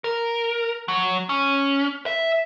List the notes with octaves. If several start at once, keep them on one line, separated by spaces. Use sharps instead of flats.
A#4
F#3
C#4
E5